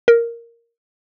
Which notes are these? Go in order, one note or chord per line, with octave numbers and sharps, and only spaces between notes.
A#4